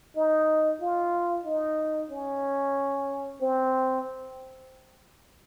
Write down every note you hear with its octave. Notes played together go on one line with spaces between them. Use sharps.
D#4
F4
D#4
C#4
C4